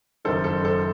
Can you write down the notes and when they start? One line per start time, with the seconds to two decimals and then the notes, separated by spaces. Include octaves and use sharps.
0.25 F#1 F#2 D#3 A4 C5
0.44 A4 C5
0.64 A4 C5